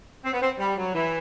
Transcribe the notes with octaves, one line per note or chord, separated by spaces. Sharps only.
C4
B3
C4
G3
F#3
E3